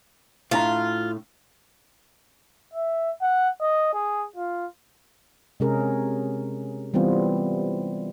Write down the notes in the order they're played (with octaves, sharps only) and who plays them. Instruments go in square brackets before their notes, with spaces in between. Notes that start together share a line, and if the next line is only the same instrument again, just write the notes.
[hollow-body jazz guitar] A2 D4 A#5 [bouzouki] F4
[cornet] E5
F#5
D#5
G#4
F4
[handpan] C3 G#3 C#4 G#4 A#4
E3 G3 B3 C4 F4